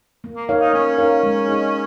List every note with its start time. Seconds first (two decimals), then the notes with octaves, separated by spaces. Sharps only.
0.24 A#3
0.36 A#3
0.49 D#4 A#4 C#5 F5
0.61 D#4
0.73 A#3 C#4
0.98 D#4 A#4 C#5 F5
1.23 G#3
1.48 D#4 G#4 D#5